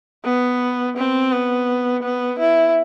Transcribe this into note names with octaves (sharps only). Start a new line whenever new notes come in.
B3
C4
B3
B3
E4